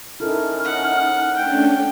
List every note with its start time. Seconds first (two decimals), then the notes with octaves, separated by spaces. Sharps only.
0.20 C#4 D#4 E4 A4 A#4 F6
0.65 F#5
1.36 A3 C#4 D4 G5